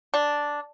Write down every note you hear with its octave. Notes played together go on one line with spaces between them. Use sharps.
D4